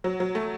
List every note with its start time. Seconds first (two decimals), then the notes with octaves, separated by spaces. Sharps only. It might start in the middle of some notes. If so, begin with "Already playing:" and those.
0.04 F#3
0.20 F#3
0.35 A3